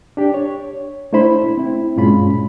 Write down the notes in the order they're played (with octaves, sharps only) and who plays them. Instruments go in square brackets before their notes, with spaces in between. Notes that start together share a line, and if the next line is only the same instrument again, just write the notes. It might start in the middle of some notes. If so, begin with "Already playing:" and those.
[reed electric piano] D4 G4
C#5
A3 D4 E4 C5 B5
C4 E4
G2 A#2 G#3 C#4 F4 B5